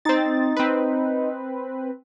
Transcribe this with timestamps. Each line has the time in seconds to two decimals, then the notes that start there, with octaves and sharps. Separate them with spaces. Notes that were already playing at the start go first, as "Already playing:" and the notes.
0.05 C4 D#4 A6
0.57 C4 B4